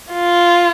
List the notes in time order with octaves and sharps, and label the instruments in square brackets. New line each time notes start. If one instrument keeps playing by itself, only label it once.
[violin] F4